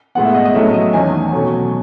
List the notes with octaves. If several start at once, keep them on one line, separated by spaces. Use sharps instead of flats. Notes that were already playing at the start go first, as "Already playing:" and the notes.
A2 G#3 B3 F#5
E5
D#5
D#5
A2 F#3 A3 C#4 E5
D#5
E2 D#3 A3 C#4 G#5
B2 F#3 A3 C#4